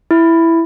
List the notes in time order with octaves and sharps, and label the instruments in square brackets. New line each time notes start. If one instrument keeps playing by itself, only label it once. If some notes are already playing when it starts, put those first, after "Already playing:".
[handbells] E4